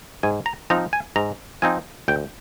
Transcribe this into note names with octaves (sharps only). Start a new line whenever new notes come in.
G#2 G#5
A#5
F3 C4 D#4 A#5
G#5
G#2 A#5
F3 C4 D#4 G#5
D2 G5